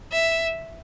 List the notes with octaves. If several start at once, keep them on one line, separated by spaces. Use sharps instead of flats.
E5